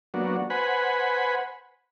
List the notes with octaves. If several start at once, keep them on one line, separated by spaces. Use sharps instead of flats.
F#3 A#3 B3 D4 F#4
B4 C5 F#5 G#5 B5